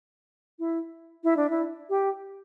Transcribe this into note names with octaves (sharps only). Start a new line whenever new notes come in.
E4
E4
D4
E4
G4